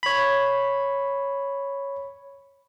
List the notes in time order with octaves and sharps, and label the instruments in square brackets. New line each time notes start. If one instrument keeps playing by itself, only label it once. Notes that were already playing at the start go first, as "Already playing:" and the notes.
[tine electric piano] C#5 B5